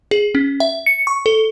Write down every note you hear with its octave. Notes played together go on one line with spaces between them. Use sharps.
G#4
C#4
E5
C#7
C#6
A4